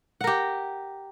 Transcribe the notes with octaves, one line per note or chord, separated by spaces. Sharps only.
G4 A#4 F#5